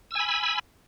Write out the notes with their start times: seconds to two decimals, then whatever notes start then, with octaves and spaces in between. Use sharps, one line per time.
0.11 E6
0.15 G#5
0.20 B5